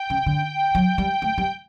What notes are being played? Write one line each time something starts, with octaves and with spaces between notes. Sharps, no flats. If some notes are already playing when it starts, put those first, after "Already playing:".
Already playing: G5
C#3
D3
F#3
G3
A3
G3